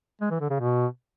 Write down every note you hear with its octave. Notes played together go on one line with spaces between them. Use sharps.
G#3
E3
D3
C#3
B2